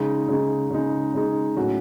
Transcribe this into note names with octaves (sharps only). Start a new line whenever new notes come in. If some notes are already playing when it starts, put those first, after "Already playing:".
Already playing: C#3 G#3 D#4
C#3 G#3 D#4
C#3 G#3 D#4
C#3 G#3 D#4
A2 F#3 C#4 F#4